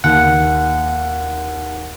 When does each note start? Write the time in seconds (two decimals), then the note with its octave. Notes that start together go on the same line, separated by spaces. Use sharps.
0.04 D#2 F#5